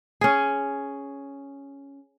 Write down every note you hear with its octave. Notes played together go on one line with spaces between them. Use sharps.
C#4 G#4